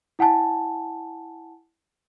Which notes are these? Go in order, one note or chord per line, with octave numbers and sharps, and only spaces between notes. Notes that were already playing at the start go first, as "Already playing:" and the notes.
E4 F#5 G#5 A5